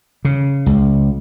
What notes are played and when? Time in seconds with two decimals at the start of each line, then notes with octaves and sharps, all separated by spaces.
0.25 C#3
0.66 C#2